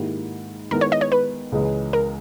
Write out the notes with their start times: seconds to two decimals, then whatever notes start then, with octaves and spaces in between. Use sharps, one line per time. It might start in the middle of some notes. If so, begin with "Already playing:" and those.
Already playing: G#2 D#3 A#3 E4 G4
0.71 D#3 G#3 B3 E4 A#4
0.81 C#5
0.92 D#5
1.01 C#5
1.12 B4
1.52 C#2 C#3 E3 G#3
1.93 A#4